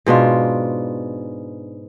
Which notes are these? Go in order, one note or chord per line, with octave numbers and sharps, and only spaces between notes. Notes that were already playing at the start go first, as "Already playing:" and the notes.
G#2 B2 D4 F4